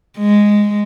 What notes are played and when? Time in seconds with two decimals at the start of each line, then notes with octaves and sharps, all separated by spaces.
0.19 G#3